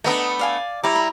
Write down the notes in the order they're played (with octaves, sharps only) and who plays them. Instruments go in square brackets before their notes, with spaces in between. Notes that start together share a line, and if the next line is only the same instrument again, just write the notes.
[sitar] A3 B3 D4 [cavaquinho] D#5 A#5 D#6
[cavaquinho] D5 F5 G#5
[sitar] G3 [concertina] E4 A#5 [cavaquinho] C#5 D6
[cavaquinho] B5